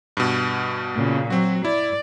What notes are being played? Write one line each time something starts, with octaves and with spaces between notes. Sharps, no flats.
G2 B2
A#2 C#3
F#3 C4 F#4
E4 D5